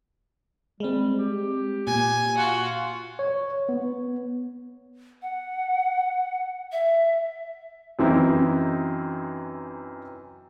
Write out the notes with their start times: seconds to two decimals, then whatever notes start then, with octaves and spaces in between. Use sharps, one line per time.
0.80 G3 G#3 C4
1.18 G4
1.87 A#2 G#5
2.37 F4 F#4 F#5
3.19 C#5
3.69 B3
5.22 F#5
6.72 E5
7.99 F#2 E3 C4 D#4 E4